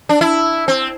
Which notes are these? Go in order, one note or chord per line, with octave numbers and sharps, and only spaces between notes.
D4
E4
C4